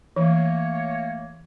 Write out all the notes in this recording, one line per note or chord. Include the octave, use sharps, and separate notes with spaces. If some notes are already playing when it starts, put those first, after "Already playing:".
E3 A3 A#3 C#5